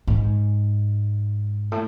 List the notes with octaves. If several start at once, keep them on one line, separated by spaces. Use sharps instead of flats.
G#2
A2